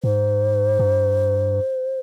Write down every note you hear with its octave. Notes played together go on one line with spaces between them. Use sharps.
G#2 C5
G2